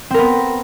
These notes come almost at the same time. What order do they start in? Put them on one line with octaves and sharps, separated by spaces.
C4 A#4 B3